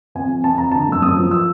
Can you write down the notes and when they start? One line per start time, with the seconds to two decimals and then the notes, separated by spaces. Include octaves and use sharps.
0.15 F2 G#5
0.29 F2
0.44 F2 A5
0.58 F2 A#5
0.72 D3 A5
0.88 F#2 E6
1.02 F#2 D#6
1.16 F3
1.31 E6